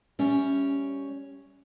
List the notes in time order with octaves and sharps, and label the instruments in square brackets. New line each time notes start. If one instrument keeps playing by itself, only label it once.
[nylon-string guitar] G3 C#4 E5